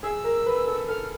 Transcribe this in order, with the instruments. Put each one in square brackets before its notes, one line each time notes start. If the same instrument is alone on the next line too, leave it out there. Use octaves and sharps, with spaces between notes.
[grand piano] G#4 [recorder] E6
[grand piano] A#4
B4
A4
[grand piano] A4 [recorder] F6